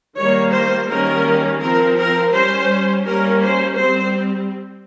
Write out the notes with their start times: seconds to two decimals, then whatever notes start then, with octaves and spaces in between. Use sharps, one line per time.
0.17 D#3 G3 A#3 C#5
0.53 C5
0.89 D#3 G3 A#3 C#4 A#4
1.61 F3 C4 A#4
1.97 A#4
2.33 G3 C#4 C5
3.05 G3 A#3 C#4 A#4
3.41 C5
3.77 G3 C4 C5